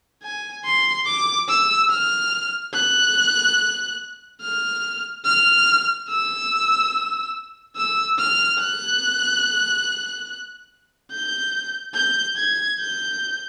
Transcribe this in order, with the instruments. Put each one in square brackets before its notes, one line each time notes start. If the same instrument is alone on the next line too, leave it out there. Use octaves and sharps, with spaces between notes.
[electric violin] G#5
C6
D6
E6
F6
F#6
F6
F6
E6
E6
F6
F#6
G6
G6
G#6
G6